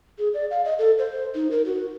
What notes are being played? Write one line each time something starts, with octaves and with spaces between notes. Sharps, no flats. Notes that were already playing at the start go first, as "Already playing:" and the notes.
G#4
D5
F5
D#5
A4
C5
D#4
A#4
F#4